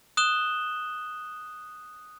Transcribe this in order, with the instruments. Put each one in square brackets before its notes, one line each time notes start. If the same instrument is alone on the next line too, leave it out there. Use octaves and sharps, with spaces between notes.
[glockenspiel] D#6 F#6 E7 G7